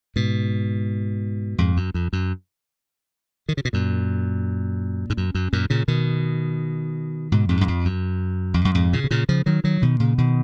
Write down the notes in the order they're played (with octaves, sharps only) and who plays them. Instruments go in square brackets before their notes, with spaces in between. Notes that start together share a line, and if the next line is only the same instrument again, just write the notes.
[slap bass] G#2 B2
F2 G#2
F#2
F2
F#2
D#3
C#3
B2
F#2 A#2
G#2
F#2
F#2
F#2 A#2
A#2 C#3
B2 D#3
G#2 B2
F2 G#2
F#2
F2
F#2
F2
F#2
F2 G#2
A#2 C#3
B2
A#2 C#3
C#3 F3
D#3 F#3
D#3 F#3
B2 D#3
A#2 C#3
B2 D#3